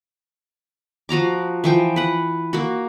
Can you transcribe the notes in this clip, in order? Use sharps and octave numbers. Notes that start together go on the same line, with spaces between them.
F3 F#4 A#5 D6
E3 F3 G5
B4 F#5
A#3 F#4